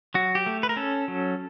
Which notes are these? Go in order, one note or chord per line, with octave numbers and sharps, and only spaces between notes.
F#3 F#4
G4
A3
B4
A#4
C#4 A4
F#3